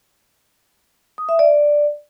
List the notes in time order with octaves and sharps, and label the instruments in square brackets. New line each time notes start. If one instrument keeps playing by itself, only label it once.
[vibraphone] D#6
E5
D5